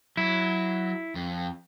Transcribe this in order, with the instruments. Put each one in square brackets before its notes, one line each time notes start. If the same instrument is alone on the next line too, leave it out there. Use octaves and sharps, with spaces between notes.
[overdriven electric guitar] F#3 [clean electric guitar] E4
[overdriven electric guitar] F2